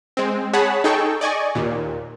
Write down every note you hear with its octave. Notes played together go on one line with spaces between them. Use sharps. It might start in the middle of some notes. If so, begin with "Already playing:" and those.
G#3 C4
G#4 C#5 F#5 A5 B5
D#4 G#4 A4 G5 C#6
D5 D#5 G#5 C#6
D#2 A#2